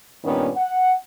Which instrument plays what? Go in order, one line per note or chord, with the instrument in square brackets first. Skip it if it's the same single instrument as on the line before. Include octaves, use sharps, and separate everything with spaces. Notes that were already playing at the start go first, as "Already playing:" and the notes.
[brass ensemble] G2 A#2 D#3 B3 C#4
F#5